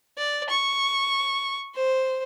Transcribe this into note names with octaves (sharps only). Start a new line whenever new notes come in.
D5
C#6
C5